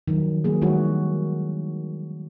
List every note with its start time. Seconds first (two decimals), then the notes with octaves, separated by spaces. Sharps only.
0.08 D#3 F3 F#3
0.44 F#3 A#3 G#4
0.62 D#3 G3 G#3 E4 F#4 C#5